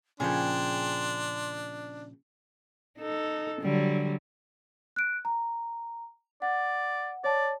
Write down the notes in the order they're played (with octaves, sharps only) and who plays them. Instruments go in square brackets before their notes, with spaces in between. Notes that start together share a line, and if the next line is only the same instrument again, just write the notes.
[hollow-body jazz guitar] A#2 C#3 F3 [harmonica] D4 [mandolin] G#4 G5 [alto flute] C6
[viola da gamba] D#4 A4
D3 F#3 G3
[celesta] F#6 D7
A#5
[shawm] D5 [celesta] F#5
[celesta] C#5 A5 [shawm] D5